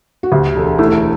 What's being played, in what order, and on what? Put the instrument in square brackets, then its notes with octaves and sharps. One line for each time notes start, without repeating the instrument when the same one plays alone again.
[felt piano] F#4
[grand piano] D2 [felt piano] G4
[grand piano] E1 [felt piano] A4
[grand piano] A3 [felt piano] E4